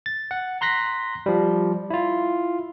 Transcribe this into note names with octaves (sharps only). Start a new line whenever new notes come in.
A6
F#5
A#5 C6 F#6 A#6 B6
F3 G3
E4 F4